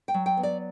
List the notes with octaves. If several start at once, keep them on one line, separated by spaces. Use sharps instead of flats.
G5
F#3
G5
B3
D5